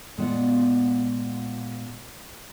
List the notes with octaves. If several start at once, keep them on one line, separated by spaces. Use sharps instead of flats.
A#2 G#3 B3 F4 D5 F#5